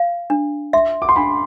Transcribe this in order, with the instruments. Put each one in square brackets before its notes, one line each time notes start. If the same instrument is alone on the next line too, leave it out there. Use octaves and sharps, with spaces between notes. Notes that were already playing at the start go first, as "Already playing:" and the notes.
Already playing: [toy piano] F5
D4
[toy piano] E5 [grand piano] C6
[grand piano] D6
C6
[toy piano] D4 [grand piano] B5